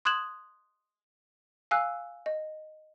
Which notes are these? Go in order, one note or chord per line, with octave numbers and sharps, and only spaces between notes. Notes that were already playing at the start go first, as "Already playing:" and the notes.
C6 D#6 F#6 G#6 E7 F#7
F5 G#5 E6 F#6
D#5